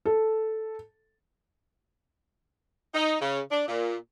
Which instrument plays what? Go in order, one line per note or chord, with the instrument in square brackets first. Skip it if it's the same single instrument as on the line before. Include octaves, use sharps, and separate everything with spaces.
[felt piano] A4
[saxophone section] D#4
C#3
D4
A#2